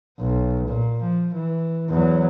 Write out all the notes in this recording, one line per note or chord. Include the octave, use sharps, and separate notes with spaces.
B1
A#2
F3
E3
E2 F#3